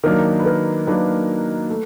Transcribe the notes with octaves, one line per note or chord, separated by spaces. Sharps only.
D#3 F#3 A#3 D4 A#4
B4
A#4
D#3 F#3 A#3 D4 B4
A3